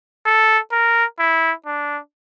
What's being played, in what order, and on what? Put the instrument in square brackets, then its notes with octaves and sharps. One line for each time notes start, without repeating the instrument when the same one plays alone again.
[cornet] A4
A#4
E4
D4